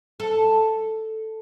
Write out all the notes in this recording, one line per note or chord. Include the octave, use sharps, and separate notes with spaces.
A4